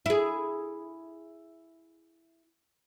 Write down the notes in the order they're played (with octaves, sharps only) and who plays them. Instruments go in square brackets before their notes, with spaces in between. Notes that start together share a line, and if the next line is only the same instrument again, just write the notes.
[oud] E4 G#4